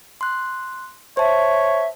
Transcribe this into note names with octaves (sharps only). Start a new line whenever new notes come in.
C6 F#6
C5 C#5 E5 A5